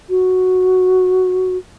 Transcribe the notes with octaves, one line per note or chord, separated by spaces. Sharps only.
F#4